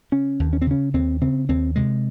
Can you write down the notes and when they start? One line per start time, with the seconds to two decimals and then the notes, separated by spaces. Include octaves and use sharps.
0.12 C#3 C#4
0.40 D#2
0.53 C#4
0.62 C4
0.67 C#3 C#4
0.94 D#2 C4
1.21 C#3 C4
1.49 D#2 C4
1.76 C3 G#3